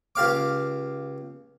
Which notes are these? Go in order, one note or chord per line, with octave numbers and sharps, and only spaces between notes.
C#2 G4 F5 D6